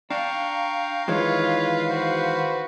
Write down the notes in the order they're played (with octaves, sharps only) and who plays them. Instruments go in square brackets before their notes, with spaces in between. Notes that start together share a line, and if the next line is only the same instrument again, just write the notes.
[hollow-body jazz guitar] D4 [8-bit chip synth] F5 [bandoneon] G5 A#5 C#6
[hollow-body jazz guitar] D#3 E3 G#3 [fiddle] F4 B4 [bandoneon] C#5
[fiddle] F#4 B4 [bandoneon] C5